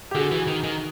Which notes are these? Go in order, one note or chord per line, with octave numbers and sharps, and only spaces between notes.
G4
D3 F#4 G#4
E3
D#3
D#3